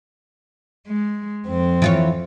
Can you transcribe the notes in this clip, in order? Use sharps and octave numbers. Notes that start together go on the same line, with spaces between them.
G#3
F2 C4
E3 F4 C#5